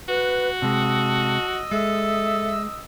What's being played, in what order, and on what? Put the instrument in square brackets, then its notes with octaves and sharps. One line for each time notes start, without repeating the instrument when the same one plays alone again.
[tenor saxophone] F#4 [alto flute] B4
[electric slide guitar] C3 G#3 [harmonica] D#5 E6 [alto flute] A5
[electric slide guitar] G#3 [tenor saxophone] A4 [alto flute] E5